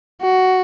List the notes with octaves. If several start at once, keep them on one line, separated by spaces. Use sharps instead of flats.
F#4